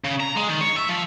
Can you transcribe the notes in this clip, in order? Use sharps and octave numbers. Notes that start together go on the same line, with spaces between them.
C#3
A#5
G#3
D#3
C#5
E5
F3